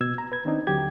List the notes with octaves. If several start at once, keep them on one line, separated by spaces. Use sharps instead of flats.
B2 E6 G#6
A#5
B4 G#6
D#3 C4 D4 D#4
D#2 D3 F#3 G4 G#6